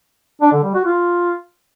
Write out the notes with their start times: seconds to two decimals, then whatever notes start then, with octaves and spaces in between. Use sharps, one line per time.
0.42 D4
0.53 D3
0.64 G3
0.74 F#4
0.85 F4